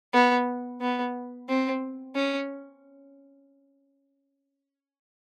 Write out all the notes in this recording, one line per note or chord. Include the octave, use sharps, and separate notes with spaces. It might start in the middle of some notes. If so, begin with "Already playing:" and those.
B3
B3
C4
C#4